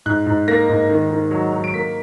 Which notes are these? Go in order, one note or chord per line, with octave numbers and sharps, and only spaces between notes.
G#2 F#6
G#2
A#3 A#6
G#2
D#3
D#3
F#3
F#3
D7
A#3 B6